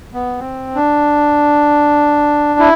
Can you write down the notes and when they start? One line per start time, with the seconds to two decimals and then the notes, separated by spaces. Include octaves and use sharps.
0.14 B3
0.39 C4
0.76 D4
2.60 E4